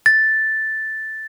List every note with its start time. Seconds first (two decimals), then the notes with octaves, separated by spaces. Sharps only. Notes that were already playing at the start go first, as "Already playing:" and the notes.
0.06 A6